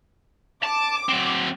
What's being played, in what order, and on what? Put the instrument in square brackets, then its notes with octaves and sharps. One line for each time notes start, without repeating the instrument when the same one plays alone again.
[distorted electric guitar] A5 [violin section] D6
[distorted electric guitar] F#3 C4